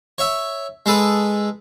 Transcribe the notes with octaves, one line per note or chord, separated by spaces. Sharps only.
C#5 E5
G#3 G#4 A4 B4